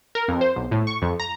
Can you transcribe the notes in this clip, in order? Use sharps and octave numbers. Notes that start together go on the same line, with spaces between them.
A#4
F2
C5
B1
A2
C#6
F2
A#5